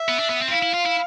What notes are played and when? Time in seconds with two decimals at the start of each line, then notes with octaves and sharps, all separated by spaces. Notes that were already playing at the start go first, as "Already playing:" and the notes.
Already playing: E5
0.08 B3
0.19 D4
0.30 B3
0.41 C4
0.48 F4
0.52 E4 F5
0.63 E4
0.74 F4
0.85 E4